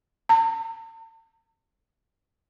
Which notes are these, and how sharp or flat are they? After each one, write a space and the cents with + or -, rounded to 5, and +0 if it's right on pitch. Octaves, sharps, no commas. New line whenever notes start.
A5 +45